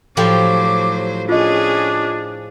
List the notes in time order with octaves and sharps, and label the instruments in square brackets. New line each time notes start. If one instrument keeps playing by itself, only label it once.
[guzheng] A2 F3 G4 [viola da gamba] F#3 C5 [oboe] D6
[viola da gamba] C#4 G#4 [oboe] D4 [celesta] F4 D#5